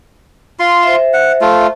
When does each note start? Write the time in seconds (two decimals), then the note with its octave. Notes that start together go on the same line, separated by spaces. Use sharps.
0.59 F4 C6
0.83 C5 E5
1.14 F#5
1.41 A3 F4